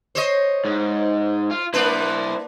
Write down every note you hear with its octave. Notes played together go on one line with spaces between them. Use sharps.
C5 C#5 D#5
G#2
F4
A#3 D4 E4 B4 C5